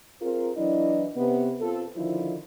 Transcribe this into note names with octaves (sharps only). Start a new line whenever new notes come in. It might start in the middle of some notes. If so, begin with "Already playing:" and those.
C4 F4 G#4 A#4
E3 F#3 D4 E4 D#5
C3 B3
C4 F4 A4
D3 D#3 F3 E4